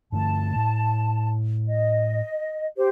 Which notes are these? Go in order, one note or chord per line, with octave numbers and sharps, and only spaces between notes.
G2 D3 A3 A5
A2
D#5
G4 C5